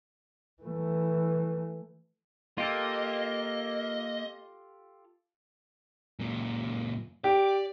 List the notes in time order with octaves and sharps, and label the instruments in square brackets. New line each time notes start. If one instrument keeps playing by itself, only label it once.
[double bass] E3 A3
[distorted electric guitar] A#3 [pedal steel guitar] F4 G4 A4 [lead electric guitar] D#5
[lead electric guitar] F#2 A#2
[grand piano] G4 [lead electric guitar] D5